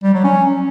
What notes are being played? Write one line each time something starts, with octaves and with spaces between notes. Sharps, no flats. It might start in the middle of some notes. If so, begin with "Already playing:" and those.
G3
F#3
C#4